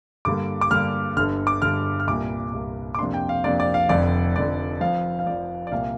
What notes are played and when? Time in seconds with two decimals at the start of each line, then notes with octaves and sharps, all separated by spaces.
0.25 G2 D3 G3 A#3 D6
0.61 D6
0.70 G2 D3 G3 A#3 F6
1.17 G1 G2 D3 F6
1.47 D6
1.62 G1 G2 D3 F6
2.00 F6
2.07 C2 A#2 G3 A#3 D6
2.53 C2 A#2 G3 A#3
2.95 D6
2.99 F2 C3 A#3 D4 C6
3.14 G5
3.29 F5
3.44 F2 C3 A#3 D4 D5
3.60 D5
3.74 F5
3.89 F1 F2 D3 D5
4.35 F1 F2 D3 D5
4.80 F2 F3 C4 F5
5.19 F5
5.26 F2 F3 C4 D5
5.67 D5
5.72 C2 A#2 A#3 F5